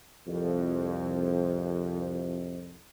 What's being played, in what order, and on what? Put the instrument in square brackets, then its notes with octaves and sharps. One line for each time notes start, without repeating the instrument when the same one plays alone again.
[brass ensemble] C2 F2